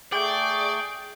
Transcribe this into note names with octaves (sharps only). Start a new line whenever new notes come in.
A3 G#4 D5 G5 C#6